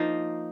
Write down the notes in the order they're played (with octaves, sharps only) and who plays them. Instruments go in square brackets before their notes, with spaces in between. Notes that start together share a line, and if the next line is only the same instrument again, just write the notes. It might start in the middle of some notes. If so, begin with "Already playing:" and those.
Already playing: [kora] F3 A#3 D#4